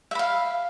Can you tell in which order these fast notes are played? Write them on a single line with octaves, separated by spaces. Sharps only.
E5 B5 F5